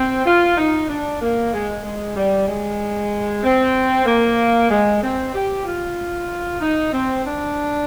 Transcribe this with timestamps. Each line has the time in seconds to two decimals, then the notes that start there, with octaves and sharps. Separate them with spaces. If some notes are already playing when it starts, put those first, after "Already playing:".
Already playing: C4
0.26 F4
0.57 D#4
0.88 D4
1.20 A#3
1.53 G#3
1.83 G#3
2.16 G3
2.48 G#3
3.43 C4
4.06 A#3
4.70 G#3
5.02 C4
5.33 G4
5.65 F4
6.60 D#4
6.92 C4
7.24 D4